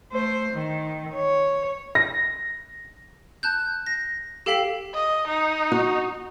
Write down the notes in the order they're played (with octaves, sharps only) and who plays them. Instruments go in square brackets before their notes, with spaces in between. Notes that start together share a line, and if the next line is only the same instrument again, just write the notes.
[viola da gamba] A3 C5
D#3
C#5
[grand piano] A#6
[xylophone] A5 F#6 G6
A#6
G4 A4 F5 G5 B6 F#7
[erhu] D#5
D#4
[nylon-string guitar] F#4